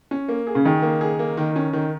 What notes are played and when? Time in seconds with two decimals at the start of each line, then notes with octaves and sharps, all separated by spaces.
0.11 C#4
0.28 A#3
0.47 G#4
0.55 C#3
0.65 D#3 G#4
0.82 A#3
1.01 G#4
1.19 A#3
1.37 D#3
1.56 C#4
1.73 D#3